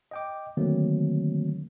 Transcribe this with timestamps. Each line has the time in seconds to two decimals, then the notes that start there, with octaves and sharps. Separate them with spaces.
0.11 D#5 G5 D6
0.57 D3 D#3 F#3 A3 A#3 C4